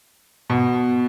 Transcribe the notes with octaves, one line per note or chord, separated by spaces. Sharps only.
B2